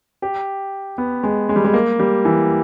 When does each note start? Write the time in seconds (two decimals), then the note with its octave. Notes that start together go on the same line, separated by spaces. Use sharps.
0.22 G4
0.98 B3
1.23 G#3
1.49 G#3
1.56 G3
1.65 G#3
1.74 A#3
1.99 G3
2.25 E3